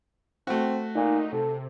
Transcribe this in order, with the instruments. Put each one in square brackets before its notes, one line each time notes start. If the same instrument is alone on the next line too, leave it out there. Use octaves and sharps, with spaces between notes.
[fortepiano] A3 F#4 [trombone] C4
[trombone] A#2 [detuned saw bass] D#4
[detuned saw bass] C3 [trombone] A4